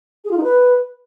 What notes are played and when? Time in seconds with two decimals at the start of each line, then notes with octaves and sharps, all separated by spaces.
0.25 G#4
0.31 F4
0.37 D#4
0.44 B4